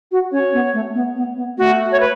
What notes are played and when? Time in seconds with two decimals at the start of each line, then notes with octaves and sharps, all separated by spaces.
0.12 F#4
0.32 C#4 C#5
0.53 B3
0.74 A3
0.95 B3
1.16 B3
1.37 B3
1.58 A3 F#4
1.91 C#5
2.00 B4